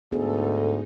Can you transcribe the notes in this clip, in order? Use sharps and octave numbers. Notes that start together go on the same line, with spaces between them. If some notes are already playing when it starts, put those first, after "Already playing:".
D2 G#2 B3 D#4 G#4 A4